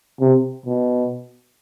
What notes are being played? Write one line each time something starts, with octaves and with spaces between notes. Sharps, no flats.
C3
B2